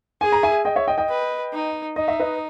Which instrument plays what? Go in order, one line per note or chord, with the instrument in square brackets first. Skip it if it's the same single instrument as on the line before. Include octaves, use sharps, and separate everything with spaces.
[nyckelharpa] G#4 [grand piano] G#5
[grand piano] A#5
E5 G#5
D#5 G5
C#5 E5
D#5 G5
D#5 G5
[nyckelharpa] B4
D#4
[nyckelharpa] D#4 [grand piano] D#5
[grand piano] E5
B4 D#5